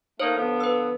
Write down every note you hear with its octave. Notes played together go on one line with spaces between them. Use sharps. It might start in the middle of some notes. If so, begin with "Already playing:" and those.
A3 A#3 D#4 C5 C#5
D3 F3 B3
B4 E6